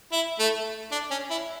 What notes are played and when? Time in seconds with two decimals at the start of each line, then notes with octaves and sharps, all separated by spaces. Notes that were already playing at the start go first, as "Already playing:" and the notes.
0.12 E4
0.39 A3
0.92 D4
1.11 C#4
1.30 E4